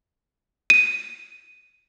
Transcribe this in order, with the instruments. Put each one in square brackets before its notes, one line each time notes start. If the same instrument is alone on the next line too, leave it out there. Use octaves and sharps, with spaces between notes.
[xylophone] D#7